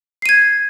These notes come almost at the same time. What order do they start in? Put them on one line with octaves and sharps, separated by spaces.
C7 D#7 G#6